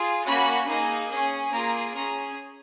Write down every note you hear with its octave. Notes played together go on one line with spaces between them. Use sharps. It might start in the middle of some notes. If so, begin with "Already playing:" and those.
Already playing: F4 G#4
A#3 C#4 F#4 B5
A#3 D#4 G#4
C#4 G#4
A#3 F4 G#4 A#5
C#4 G#4 A#5